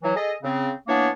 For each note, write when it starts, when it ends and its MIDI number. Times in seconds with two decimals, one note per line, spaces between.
0.03 0.13 52
0.03 0.13 54
0.16 0.33 68
0.16 0.33 69
0.16 0.33 75
0.43 0.71 49
0.43 0.71 60
0.87 1.09 52
0.87 1.09 58
0.87 1.09 59
0.87 1.09 62
0.87 1.09 73